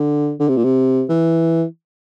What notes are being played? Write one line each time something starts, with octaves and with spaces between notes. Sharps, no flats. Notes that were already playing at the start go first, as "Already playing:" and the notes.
Already playing: D3
D3
C3
A#2
C3
E3